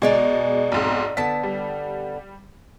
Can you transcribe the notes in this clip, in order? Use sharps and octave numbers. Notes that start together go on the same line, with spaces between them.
B2 G#3 D#4 D5 G#5
B1 F2 G#2
D3 B3 A5 B6
G3